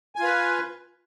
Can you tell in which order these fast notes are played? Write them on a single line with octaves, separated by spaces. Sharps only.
G#5 F4 B4